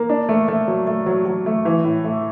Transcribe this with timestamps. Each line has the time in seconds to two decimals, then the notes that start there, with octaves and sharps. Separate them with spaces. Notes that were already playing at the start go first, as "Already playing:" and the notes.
Already playing: A#3
0.09 D4
0.29 A3
0.48 A3
0.68 F#3
0.87 A3
1.06 F#3
1.26 F#3
1.46 A3
1.65 E3
1.84 A2
2.04 A3